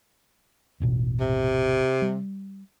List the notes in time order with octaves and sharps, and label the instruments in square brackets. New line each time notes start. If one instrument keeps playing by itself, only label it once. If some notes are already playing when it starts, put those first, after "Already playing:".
[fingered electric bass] E1 A1 B2
[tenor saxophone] C3
[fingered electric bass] G3